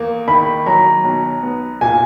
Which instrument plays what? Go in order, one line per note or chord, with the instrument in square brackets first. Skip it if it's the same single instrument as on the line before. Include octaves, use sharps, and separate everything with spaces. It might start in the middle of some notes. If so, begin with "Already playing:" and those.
Already playing: [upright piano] E2 A#3
[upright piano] D#3 [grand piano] B5
[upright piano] F#3 [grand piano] A#5
[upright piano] B1
B3
[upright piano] A#2 [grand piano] G#5